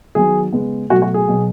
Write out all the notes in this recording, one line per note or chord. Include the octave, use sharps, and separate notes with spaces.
D#3 F#3 B3 G#4
C#3 G#3 B3
B2 F#3 A3 F#4
F#4
G#4
B2 F#3 B3